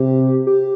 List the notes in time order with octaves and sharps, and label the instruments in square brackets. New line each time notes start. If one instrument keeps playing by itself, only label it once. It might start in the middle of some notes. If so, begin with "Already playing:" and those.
Already playing: [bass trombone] C3 [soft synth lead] G4
[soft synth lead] G4